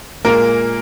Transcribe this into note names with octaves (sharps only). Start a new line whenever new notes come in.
A#2 G#3 A#3 A#4